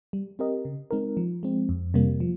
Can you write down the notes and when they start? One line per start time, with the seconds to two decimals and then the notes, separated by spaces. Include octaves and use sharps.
0.13 G3
0.39 C4 G4 A#4 D#5
0.65 C#3
0.91 G#3 C4 D#4 A#4
1.17 F3
1.43 G#3 C4
1.69 F2
1.94 C3 G3 A#3
2.20 F3